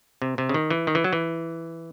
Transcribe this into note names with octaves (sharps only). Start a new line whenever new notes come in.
C3
C3
C#3
D#3
E3
D#3
E3
F#3
E3